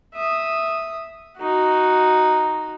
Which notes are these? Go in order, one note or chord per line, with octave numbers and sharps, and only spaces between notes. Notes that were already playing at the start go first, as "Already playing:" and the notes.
E5 D#6
D#4 F#4